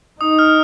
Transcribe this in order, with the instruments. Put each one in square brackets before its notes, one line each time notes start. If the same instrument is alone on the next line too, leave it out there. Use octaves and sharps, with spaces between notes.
[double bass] D#4 [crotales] D#6
[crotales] F6